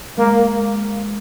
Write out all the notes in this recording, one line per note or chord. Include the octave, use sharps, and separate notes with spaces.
G#3 A#3